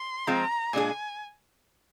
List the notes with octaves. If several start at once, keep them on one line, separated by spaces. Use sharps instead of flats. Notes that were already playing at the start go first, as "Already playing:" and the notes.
Already playing: C6
F3 G#3 C4 F4 A#5
A#2 G#3 D4 G#4 G#5